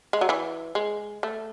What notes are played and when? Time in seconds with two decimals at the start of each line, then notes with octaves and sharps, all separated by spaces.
0.13 G#3
0.21 F#3
0.29 E3
0.75 G#3
1.23 A3